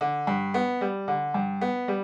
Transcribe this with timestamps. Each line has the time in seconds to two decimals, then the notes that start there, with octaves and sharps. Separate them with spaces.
0.01 D3
0.27 G2
0.54 B3
0.81 G3
1.08 D3
1.34 G2
1.61 B3
1.88 G3